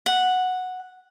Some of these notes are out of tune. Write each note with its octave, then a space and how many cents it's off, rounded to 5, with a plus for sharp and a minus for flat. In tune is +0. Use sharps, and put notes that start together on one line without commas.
F#5 -5